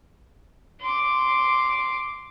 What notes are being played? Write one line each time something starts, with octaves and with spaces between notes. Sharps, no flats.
C6 D6